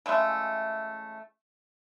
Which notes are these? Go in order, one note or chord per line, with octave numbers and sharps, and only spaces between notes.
C#3 E3 G#3 A3